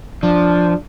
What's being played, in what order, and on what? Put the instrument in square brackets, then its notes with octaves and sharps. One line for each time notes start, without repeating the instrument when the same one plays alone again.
[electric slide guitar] F3 [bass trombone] D4